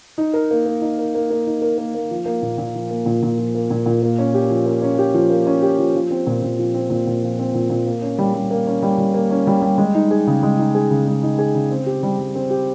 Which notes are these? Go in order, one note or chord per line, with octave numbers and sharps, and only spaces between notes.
D#4
A#4
A#3
A#3
D#4
A#4
A#3
A#3
D#4
A#4
A#3
A#3
F3
A#3
A#2
A#2
F3
A#3
A#2
A#2
F3
A#3
A#2
A#2
A#3
C#4
G4
F3
A#3
C#4
G4
F3
A#3
C#4
G4
F3
F3
C4
A#2
A#2
F3
C4
A#2
A#2
F3
C4
A#2
A#2
A#3
C#4
G3
G3
A#3
C#4
G3
G3
A#3
C#4
G3
G3
G#3
D#4
G#4
C#3
G#3
D#4
G#4
C#3
G#3
D#4
G#4
C#3
C4
G4
G3
G3
C4
G4